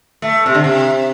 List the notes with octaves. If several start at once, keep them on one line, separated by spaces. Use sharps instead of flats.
A3
C3
D3
C3